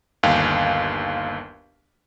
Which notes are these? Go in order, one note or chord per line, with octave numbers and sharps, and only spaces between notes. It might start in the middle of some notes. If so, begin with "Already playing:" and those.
G1 D#2 F5